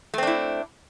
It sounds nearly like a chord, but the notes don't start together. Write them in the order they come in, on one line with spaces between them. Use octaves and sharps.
A3 C4 D4 E4